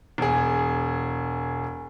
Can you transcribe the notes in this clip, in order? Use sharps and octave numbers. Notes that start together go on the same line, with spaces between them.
E1 G#4